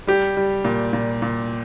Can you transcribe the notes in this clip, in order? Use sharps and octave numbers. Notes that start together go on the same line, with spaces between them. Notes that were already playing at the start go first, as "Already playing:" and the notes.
G3 G4
G3
A#2
A#2
A#2